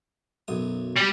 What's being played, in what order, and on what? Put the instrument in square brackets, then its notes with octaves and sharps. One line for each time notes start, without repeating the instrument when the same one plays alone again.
[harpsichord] B1 F#2 D#6
[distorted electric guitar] G3 G4